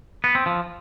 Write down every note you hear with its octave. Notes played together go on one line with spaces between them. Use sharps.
B3
C4
F3